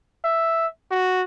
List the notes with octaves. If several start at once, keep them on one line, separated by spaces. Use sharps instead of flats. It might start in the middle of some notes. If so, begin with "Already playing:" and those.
E5
F#4